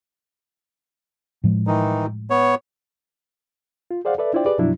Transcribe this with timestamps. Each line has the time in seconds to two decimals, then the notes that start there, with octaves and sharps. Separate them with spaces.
1.44 A2 F3 G#3
1.67 D#3 E3 D#4
2.30 B3 C#5
3.91 F4
4.05 G#4 C5 D5 F5 F#5
4.18 A4 B4 D5 E5
4.34 D4 E4 F4 C5 D5 G5
4.46 G4 G#4 B4 D5
4.58 F#2 B2 F3 F#3 D4 E4